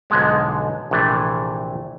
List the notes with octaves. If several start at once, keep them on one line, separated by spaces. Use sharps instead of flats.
B1 G#2 D3 F3 G#3 B3
A#1 C3 E3 A3